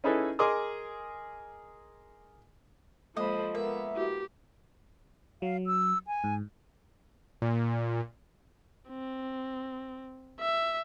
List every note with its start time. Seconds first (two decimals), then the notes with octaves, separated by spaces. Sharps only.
0.04 C#4 D#4 E4 G#4 A4 B4
0.39 G#4 A#4 D#5 C6 D6 D#6
3.17 F3 G#3 A#3 A4 C5 D#5 B5
3.55 G#3 A#3 B3 A#4 E5
3.95 E4 F#4 G4
5.42 F#3 F5
5.66 E6
6.07 G#5
6.24 G#2
7.42 A#2
8.89 C4
10.40 E5